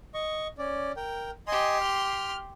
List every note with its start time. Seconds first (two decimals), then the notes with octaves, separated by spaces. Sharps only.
0.14 D#5 C#6
0.58 C#4 D5
0.97 A#4 G5
1.47 G4 D#5 G#5 C6
1.81 F6